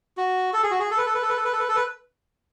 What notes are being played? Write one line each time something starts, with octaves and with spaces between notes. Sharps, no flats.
F#4
A4
G#4
F#4
G#4
A4
B4
A4
B4
A4
B4
A4
B4
A4
B4
A4
B4